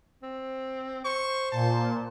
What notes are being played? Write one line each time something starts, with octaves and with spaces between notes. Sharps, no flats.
C4
C5 C#6
A#2 A5